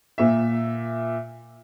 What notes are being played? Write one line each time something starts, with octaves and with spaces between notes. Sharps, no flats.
A#2 E5